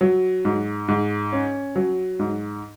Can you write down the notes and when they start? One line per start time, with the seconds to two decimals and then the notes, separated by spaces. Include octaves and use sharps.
0.01 F#3
0.45 G#2
0.88 G#2
1.32 C#4
1.76 F#3
2.19 G#2